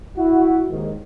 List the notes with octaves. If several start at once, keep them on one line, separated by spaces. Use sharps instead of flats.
E4 F#4
D#2 G#2 D#3